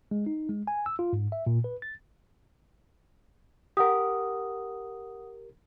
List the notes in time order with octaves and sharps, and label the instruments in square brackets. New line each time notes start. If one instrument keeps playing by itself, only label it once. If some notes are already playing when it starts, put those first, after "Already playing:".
[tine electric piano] G#3
D#4
G#3
G#5
E6
F4
G#2
E5
A#2
B4
A6
[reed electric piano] G4 A#4 [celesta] F#5 D#6